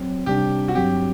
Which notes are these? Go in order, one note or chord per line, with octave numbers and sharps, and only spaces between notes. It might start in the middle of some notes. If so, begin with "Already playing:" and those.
Already playing: F#3 C4
C3 G3 D4 G4
F#4
G2 F#3 C4 G4